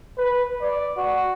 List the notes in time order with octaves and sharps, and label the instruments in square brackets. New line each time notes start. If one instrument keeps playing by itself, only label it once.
[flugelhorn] B4
D5
F#4